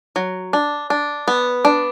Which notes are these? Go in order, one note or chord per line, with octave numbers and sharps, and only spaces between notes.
F#3
D4
D4
B3
D4